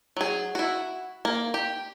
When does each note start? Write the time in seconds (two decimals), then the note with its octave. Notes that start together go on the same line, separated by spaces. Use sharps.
0.17 F#3 G#4
0.55 E4 F#4
1.25 A#3
1.54 G4